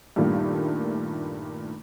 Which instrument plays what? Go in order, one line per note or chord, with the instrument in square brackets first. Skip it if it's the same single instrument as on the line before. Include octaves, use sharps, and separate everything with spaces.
[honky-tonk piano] G2 A#2 D#3 G3 A3 A#3